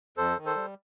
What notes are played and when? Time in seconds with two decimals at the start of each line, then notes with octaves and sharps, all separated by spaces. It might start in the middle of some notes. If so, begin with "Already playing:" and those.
0.17 F2 A4 C5
0.37 D#3
0.45 A4 C5
0.56 G3